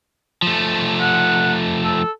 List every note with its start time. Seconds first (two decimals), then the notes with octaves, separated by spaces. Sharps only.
0.43 F3 A3
1.00 F#5
1.84 A4